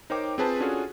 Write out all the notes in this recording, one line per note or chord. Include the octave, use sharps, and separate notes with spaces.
D#4 A#4 C5 C#5 G5 D6
C4 F4 G#4 B4 C5 A5
C#4 D4 F4 F#4 G#4 A4